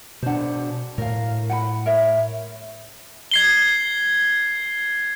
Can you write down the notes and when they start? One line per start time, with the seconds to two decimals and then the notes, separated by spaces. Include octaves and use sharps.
0.22 B2 D4 C5 F#5
0.98 A2 A#4 F5
1.50 F#5 G5 B5
1.86 A#4 C#5 E5
3.31 G#6 C7 G7